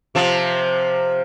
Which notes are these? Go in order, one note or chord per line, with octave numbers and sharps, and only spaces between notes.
C3 F3